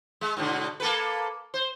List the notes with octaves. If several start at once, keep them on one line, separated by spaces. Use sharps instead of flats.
G#3
G#2 B2 D3
A#3 A4 B4
C5